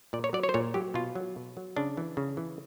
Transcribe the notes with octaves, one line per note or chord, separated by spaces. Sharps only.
A#2 D5
C#5
F#3 D5
C#5
C5
A#2 C#5
F#3 G4
B2 F4
F#3
B2
F#3
C#3 D4
E3
C#3
E3